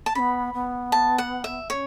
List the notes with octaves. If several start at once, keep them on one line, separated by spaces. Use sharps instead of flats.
A5
B3 C#4 B5
B3
A5
F#5
E5
C#4 C#5